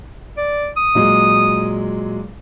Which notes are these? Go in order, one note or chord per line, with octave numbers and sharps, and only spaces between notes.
D5
D#6
A#2 F#3 G#3